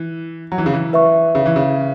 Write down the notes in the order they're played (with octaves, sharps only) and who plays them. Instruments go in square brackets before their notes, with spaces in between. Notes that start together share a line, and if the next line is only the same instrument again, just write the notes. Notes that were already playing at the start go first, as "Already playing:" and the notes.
Already playing: [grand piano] E3
F#3
E3
C#3
E3
[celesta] B4 E5 C#6
[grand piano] C#3
E3
C#3